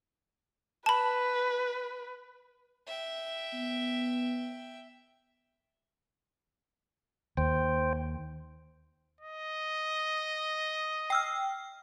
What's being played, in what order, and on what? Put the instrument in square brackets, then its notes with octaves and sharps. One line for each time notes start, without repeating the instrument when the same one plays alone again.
[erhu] B4 [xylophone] A5 B5
[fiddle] E5 G5
[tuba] B3
[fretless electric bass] D#2 [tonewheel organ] C5 G5
[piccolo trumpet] D#5
[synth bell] G5 E6 F6